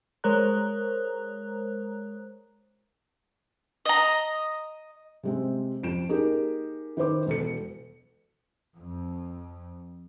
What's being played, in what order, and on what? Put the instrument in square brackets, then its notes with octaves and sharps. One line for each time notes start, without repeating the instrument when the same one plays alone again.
[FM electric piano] G#3 A#4 C5 C#5 A#5 F#6
[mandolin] D#5 A#5
[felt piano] C3 G#3 C4
F2 D7 E7
A#3 D#4 G4 G#4 A#4
D#3 B4 C5 D6
E1 A4 C#7
[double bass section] F2